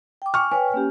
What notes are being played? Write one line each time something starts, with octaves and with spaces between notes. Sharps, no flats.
G5 D6
G#5 C#6 F6
B4 C#5 G5 G#5
A#3 C#4 G4